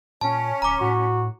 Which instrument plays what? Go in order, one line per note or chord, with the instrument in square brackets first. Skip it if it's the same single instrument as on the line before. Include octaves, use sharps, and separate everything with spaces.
[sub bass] A#2 [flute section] C#4 [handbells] A5
[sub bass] D1 [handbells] A#5 D6
[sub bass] A2 [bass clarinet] F#4